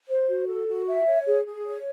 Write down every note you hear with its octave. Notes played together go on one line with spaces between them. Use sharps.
C5
F#4
A4
F#4
E5
C#5
G#4
G#4
C#5